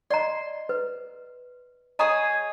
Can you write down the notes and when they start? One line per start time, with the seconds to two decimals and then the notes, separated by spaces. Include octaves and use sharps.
0.10 D5 D#5 A#5 C6
0.69 B4
1.99 G#4 C#5 D#5 G#5 A#5 D#6